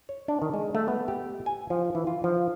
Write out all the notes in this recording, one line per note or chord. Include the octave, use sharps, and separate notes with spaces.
C#5
D4
D#3
G#3
A3
B3
G4
G#5
F3
E3
F4
F3